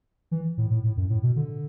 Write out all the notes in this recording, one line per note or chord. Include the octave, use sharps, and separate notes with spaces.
E3
A2
A2
A2
F#2
A2
B2
D3